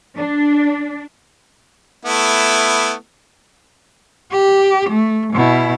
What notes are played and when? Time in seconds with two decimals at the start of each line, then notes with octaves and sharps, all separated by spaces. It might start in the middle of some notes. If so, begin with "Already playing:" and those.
0.17 D4
2.05 A3 B3 E4
4.32 G4
4.90 A3
5.33 B2 E4